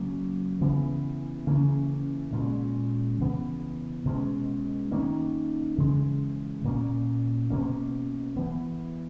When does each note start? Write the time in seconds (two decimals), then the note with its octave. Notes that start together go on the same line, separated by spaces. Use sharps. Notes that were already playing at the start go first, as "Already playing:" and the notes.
Already playing: C#3 F#3 A#3 C#4
0.61 C#3 E3 B3
1.46 C#3 E3 A#3 C#4
2.33 A#2 G#3 C#4
3.19 C#3 E3 B3
4.05 B2 G#3 C#4
4.92 D#3 A#3 C#4
5.78 C#3 E3 G#3
6.64 A#2 A#3 C#4
7.50 B2 A#3 C#4
8.37 E3 B3